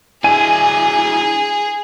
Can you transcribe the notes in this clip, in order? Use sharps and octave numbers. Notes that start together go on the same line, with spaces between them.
D4 E4 G#4 G#5 D#7